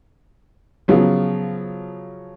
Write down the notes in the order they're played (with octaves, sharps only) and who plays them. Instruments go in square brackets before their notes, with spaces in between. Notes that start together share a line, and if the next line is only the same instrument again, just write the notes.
[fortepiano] C#3 F3 F#3 B3